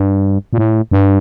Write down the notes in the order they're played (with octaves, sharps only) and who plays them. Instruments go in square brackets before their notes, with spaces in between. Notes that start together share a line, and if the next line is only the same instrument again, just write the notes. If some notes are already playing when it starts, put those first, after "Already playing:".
Already playing: [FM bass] G2
A#2
A2
G2